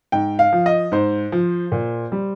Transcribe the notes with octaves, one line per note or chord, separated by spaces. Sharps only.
G#2 G5
F5
F3
D#5
G#2 C5
F3
A#2
G3